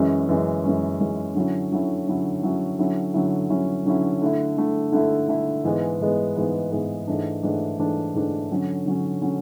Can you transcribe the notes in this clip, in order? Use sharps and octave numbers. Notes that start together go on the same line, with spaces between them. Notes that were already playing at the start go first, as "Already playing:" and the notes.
Already playing: F#2 E3 G#3 C#4
F#2 E3 G#3 C#4
F#2 E3 G#3 C#4
F#2 E3 G#3 C#4
D3 F#3 C#4 E4
D3 F#3 C#4 E4
D3 F#3 C#4 E4
D3 F#3 C#4 E4
D3 F#3 C#4 E4
D3 F#3 C#4 E4
D3 F#3 C#4 E4
D3 F#3 C#4 E4
D3 A3 E4
D3 A3 E4
D3 A3 E4
D3 A3 E4
G#2 E3 G#3 B3
G#2 E3 G#3 B3
G#2 E3 G#3 B3
G#2 E3 G#3 B3
G#2 E3 A3 D4
G#2 E3 A3 D4
G#2 E3 A3 D4
G#2 E3 A3 D4
D3 F#3 C#4
D3 F#3 C#4
D3 F#3 C#4